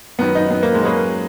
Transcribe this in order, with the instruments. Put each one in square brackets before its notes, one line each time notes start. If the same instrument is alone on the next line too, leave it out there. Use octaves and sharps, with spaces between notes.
[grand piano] F#2 D#3 F#3 [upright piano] B3
[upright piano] D#4
B3
A#3
G#3
[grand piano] F#3 C#4 G#4 B4 [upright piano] A#3